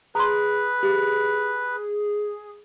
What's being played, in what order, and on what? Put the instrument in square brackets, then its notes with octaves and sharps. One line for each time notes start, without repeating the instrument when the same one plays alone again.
[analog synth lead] G#4 [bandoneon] B4 [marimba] A#5 C6
[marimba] G4